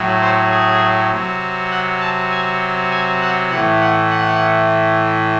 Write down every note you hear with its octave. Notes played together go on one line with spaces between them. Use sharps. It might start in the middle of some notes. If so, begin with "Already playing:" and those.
Already playing: A2 F#3
C5
G#4
C3 F#3
F#5
A5
G#5
G#5
F#5
A2 E3 F#5
F#5
F#5